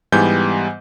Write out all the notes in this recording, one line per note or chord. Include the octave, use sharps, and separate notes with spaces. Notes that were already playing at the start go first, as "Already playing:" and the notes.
G#2 E3 G3 B3 G#5 G6